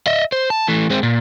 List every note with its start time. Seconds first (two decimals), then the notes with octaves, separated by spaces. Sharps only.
0.07 D#5 E5
0.32 C5
0.50 A5
0.68 E3 A3
0.90 G#3 C4
1.03 A#2